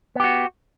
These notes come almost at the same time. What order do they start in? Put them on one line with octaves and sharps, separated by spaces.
B3 G4 F#4